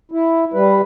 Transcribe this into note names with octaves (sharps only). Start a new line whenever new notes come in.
E4
G3 B4